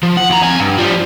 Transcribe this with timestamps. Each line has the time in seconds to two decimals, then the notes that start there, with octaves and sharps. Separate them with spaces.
0.03 F3
0.17 F#5
0.30 D#2 A#5
0.43 F2 G#5
0.60 G2
0.78 F3 G3